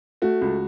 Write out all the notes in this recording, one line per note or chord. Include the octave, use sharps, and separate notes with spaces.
A3 F#4
C#2